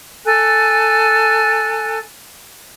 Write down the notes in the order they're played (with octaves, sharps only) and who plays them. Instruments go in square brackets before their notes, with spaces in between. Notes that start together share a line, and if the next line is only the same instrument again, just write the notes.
[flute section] A4 G#5 F#6